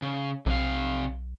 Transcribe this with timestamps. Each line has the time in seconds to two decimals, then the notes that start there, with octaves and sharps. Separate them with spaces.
0.02 C#3
0.46 B1 C3 F5